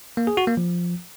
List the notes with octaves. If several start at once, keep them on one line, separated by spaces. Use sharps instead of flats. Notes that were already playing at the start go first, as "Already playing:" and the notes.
A#3
G#4
F#4
A#3
F3